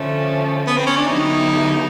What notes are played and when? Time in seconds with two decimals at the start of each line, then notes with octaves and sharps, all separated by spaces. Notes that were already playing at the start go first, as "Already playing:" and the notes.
Already playing: D3 F3 A3 C#4
0.67 B3
0.77 C4
0.87 C#4
0.97 D4
1.06 D3 F#3 B3 D#4 E4 G4